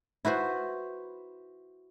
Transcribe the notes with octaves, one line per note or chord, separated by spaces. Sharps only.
E4 F#4 B4 C5